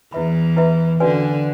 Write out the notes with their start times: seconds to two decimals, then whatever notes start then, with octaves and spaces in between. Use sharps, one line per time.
0.12 E2 E3 E4 B4 E5 B5
0.56 E4 B4 E5 B5
1.00 D3 C#4 F#4 B4 D5 G#5